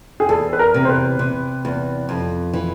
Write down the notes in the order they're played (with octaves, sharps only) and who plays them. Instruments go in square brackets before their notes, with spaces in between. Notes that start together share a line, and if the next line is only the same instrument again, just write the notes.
[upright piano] G#4
[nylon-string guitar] E2 [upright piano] A4
[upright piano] B4
A#4
[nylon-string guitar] C3
[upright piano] C5
B4
[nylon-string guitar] C3
E2
F2
E3